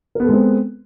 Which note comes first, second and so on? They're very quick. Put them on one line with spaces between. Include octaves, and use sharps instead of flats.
A#4 B3 A4 G#3 C4